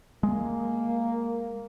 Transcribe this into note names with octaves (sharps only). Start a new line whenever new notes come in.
G#3 A#3